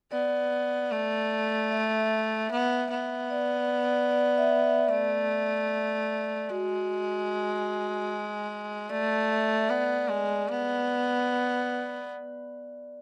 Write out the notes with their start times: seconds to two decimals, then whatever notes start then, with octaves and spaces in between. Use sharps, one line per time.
0.12 B3 D5
0.91 A3
1.71 E5
2.52 B3
2.91 B3
3.30 D5
3.57 D5
3.84 D5
4.11 D5
4.38 E5
4.64 E5
4.90 A3 D5
6.50 G#3 F#4
8.89 A3 D5
9.29 E5
9.69 B3 D5
10.09 G#3
10.49 B3